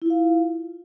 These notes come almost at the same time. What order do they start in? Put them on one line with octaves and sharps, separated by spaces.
E4 F4 F5